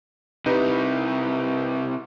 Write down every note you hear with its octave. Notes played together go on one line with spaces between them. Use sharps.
C3 D#4 E4 G4 B4